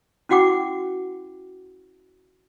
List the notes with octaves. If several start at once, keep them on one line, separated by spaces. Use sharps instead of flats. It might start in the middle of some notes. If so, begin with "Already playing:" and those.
C#4 E4 F#4 F#5 G5 D6